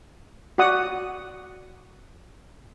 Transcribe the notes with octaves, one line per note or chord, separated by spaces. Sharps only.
F#4 D5 F#5 D#6